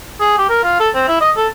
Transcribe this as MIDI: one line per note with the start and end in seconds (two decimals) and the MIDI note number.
0.21 0.34 68
0.38 0.49 67
0.50 0.62 70
0.63 0.76 65
0.80 0.89 69
0.95 1.04 60
1.08 1.20 64
1.21 1.31 75
1.37 1.47 69